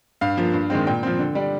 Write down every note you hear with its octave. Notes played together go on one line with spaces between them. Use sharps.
G2 F5
F3 A#3
G2
D#3 G#3 C4
A#2 G5
F3 C4
D3
G3 D4